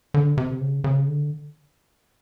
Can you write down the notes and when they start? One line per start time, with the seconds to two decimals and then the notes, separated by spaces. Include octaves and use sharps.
0.14 D3
0.38 C3
0.61 C#3
0.84 C#3
1.07 D3